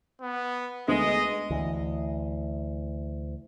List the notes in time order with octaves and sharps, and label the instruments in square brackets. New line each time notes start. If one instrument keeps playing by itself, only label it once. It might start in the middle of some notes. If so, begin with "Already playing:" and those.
[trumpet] B3
[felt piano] D2 B3 [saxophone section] G#3 [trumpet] D#5
[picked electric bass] D2 E3